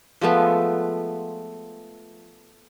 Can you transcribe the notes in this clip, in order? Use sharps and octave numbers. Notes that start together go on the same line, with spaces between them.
F3 G#3 A3 B3